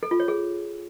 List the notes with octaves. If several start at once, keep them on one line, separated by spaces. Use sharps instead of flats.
A4
F4
C#5
G#4